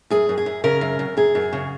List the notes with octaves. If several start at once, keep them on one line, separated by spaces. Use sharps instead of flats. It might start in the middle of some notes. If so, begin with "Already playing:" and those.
F#2 G#4
F#2
G#4
F#2
C#3 A#4
F#2
F#2
F#2 G#4
F#2
C#3